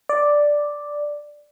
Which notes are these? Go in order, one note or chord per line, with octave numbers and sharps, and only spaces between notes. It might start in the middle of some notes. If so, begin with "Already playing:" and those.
D5